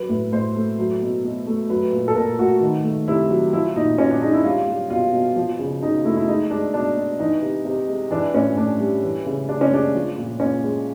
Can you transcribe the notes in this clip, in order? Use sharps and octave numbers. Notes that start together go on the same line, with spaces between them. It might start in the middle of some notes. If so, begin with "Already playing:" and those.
Already playing: F#3 B4
A2
A2 C5
A3
F#3
B2
B2
A3
F#3 B4
A#2
A4
A#2 A#4
A3 F#4
D#3
A3
C3 E4
F#3
F3 E4
A#2 D#4
A#2 C#4
D4
G#3 D#4
E4
G3 F4
G3
B2 F4
B2
F3
C#3
C#3 D#4
A3 E4
E4
G#3 D#4
G#3 D4
B2 D4
B2
E3 D#4
C3
C3
G#3
E3 D4
A2 C#4
A2 D4
G3
E3
C#3
C#3 D4
C#4
G#3 D4
F3
A#2
A#2 C#4
G#3